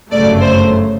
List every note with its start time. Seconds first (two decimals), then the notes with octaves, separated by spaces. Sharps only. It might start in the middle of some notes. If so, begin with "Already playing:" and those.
0.11 G1 F#2 C#3 F#3 A3 D5
0.41 C5